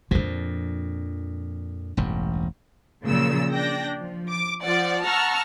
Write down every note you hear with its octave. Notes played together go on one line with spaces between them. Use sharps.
F2 A#2 F3 D4
E1 A1 G2
A#2 C#3 F3 F#3 E6
D4 G5 A#6
F3
D6
F3 D5 F#5
F#5 A5 A#5 C#6 E6 F6